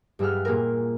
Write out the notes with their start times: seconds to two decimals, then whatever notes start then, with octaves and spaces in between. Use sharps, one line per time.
0.19 G2 G3 G#4 E5 F#5 F6
0.45 A#2 A#3 G#4 A#4